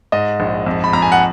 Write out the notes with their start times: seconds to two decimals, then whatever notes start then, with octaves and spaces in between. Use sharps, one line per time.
0.12 G#2 D#5
0.40 A#1
0.66 F2
0.84 B5
0.93 F2 A#5
1.02 G#5
1.12 F#5